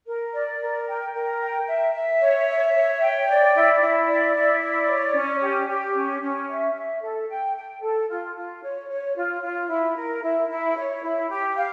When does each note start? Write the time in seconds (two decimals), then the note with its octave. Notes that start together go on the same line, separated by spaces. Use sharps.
0.07 A#4
0.33 D5
0.60 A#4
0.87 G5
1.14 A#4
1.40 G5
1.67 E5
1.93 E5
2.20 C#5
2.47 E5
2.74 C#5
3.00 G5
3.27 D5
3.54 E4
3.80 E4
4.07 D5
4.34 E4
4.61 D5
4.87 C#5
5.14 C#4
5.41 G4
5.68 G4
5.95 C#4
6.21 C#4
6.48 E5
6.74 E5
7.01 A4
7.29 G5
7.55 G5
7.82 A4
8.09 F4
8.35 F4
8.62 C#5
8.89 C#5
9.15 F4
9.42 F4
9.69 E4
9.95 A#4
10.22 E4
10.49 E4
10.76 C#5
11.02 E4
11.29 G4
11.56 F5